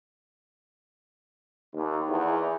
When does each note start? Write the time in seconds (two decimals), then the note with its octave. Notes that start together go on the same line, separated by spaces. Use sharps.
1.74 D#2
2.10 E2